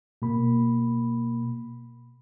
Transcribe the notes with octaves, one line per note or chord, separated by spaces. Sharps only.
B2 A#3 B5